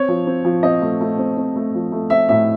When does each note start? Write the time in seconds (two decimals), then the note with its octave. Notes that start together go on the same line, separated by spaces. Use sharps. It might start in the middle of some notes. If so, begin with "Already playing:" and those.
Already playing: C4 C#5
0.08 F3
0.27 C4
0.45 F3
0.63 C4 D#5
0.82 A3
1.01 A3
1.19 C4
1.37 C4
1.56 A3
1.74 F3
1.92 A3
2.10 C4 E5
2.29 A2 E5